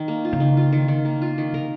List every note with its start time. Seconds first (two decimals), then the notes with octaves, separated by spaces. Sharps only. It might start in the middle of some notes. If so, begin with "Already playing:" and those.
Already playing: D#3
0.08 A#3
0.25 F4
0.33 C#3
0.40 D#3
0.57 F4
0.73 D#3
0.88 D#3
1.05 A#3
1.22 F4
1.38 D#3
1.53 C3 A#4